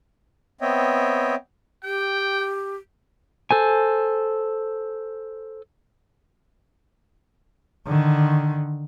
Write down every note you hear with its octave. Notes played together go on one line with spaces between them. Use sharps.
B3 C4 C#5 D#5 E5 G5
G4 G5
A4 C5 G#5
D3 D#3